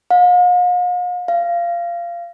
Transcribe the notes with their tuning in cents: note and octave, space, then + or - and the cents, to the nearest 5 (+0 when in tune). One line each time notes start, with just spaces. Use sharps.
F5 +45
F5 -20